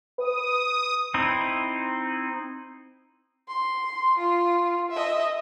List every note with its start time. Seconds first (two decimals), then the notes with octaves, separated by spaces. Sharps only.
0.18 B4 D#6
1.14 C4 D#4 E4
3.48 C6
4.18 F4
4.92 D#5 E5